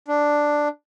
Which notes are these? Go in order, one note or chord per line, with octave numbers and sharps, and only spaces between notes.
D4